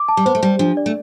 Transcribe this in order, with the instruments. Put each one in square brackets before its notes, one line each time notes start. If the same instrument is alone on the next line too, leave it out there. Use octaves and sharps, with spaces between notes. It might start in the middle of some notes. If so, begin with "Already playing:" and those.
Already playing: [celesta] D6
A5
[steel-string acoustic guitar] G3
[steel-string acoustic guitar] B3 [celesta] C5
[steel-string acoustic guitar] A3
[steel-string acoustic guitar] G3 [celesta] G4
[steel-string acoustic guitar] F3 [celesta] D4
[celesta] D5
[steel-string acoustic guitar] A3